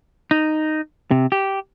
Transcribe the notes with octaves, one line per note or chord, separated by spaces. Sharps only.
D#4
C3
G4